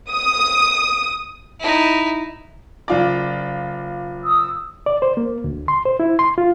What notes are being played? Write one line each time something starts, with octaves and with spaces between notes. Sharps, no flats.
D#6
D#4 E4
F#1 F4 D5
D#6 E6
D5
C5
A#3
D2
C6
C5
E4
C6
F4